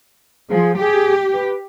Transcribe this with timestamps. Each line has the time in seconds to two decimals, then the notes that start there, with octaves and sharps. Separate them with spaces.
0.49 F3 G#4
0.80 G4 G#4
1.33 B4